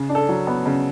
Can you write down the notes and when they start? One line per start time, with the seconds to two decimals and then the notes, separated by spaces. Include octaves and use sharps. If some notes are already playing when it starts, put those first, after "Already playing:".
Already playing: C#3
0.09 D4
0.15 A4
0.29 F#3
0.47 B3
0.66 C#3